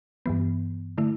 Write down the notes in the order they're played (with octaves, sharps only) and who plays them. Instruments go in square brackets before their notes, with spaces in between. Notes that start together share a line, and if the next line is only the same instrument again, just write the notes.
[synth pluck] G2 E3 B3
D3 A3 E4